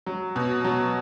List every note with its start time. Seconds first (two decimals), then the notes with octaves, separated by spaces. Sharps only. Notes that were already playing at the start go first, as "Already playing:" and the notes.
0.06 F#3
0.36 B2
0.64 F#3